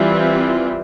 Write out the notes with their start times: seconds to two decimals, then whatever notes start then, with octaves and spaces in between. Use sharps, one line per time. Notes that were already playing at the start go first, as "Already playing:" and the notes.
Already playing: E3 G3 C4 F4